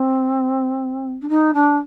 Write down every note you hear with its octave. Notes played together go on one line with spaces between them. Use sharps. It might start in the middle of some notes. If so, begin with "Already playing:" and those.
Already playing: C4
D4
D#4
D4